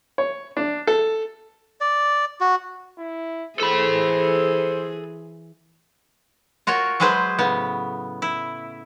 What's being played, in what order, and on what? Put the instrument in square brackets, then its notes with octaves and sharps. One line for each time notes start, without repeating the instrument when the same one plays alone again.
[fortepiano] C#5
D4
A4
[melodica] D5
F#4
[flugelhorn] E4
[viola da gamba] E3 G#4 [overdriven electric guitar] A4 B5 [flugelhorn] C5
[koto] F4 F#4 A#4 C#5
F#3 G#3 G#4 B4 C5
A2 C#3 B3
E4